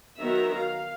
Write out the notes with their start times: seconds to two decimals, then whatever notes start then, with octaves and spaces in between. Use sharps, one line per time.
0.19 D#3 F#3 B3 F#4 E5 A#5
0.57 F5